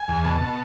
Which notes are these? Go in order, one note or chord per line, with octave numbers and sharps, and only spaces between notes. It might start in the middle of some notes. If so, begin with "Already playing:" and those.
Already playing: G#5
E2
B2 A5
B2